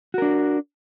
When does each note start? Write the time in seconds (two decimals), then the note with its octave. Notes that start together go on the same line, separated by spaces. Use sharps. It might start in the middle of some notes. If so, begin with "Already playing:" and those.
0.14 F#4
0.18 A#4
0.22 D4